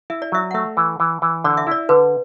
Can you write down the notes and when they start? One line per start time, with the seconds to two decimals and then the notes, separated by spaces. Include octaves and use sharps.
0.10 E4 E5
0.22 D5
0.32 F#3 E5
0.51 F#5
0.54 A3 E5
0.77 E3
1.00 E3
1.22 E3
1.44 D3 D5
1.57 E5
1.67 E4 D5
1.89 D3 B4